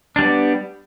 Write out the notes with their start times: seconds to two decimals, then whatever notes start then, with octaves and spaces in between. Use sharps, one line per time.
0.16 D4
0.19 G3
0.21 B3